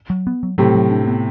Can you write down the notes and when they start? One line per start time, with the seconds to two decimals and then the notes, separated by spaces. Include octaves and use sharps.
0.10 F#3
0.27 B3
0.43 F#3
0.58 A2 C3 F#3
0.74 F#3
0.91 D4
1.08 B3